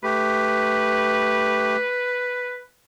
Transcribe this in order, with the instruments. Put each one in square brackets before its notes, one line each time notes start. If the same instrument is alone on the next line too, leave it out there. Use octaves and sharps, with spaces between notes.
[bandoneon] A3 G4 [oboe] B4